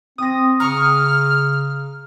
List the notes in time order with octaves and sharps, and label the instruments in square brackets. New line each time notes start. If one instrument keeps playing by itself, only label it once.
[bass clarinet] C4 [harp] D#6 A#6
[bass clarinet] C#3 [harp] A#5 C#6 D#6 [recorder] F6